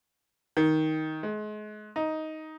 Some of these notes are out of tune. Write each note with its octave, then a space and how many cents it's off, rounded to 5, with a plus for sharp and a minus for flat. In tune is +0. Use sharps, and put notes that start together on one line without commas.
D#3 +10
G#3 +35
D#4 +10